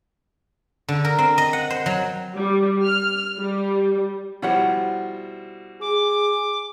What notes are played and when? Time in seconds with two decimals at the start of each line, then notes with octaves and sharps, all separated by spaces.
0.88 D3
1.05 A#4
1.18 C4
1.38 D#5
1.53 F#5
1.70 C5
1.86 F#3
2.36 G3
2.84 F6
3.38 G3
4.42 B2 F3 G3 E4 C#5 F#5
5.81 G#4 D6